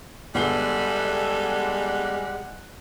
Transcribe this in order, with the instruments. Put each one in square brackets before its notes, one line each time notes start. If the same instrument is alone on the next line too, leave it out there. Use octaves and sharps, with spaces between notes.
[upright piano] G1 C7 G7 [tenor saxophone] G3 [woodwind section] G#3 F#5 [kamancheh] G#4 A4